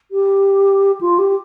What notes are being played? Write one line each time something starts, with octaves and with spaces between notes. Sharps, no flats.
G4
F4
G4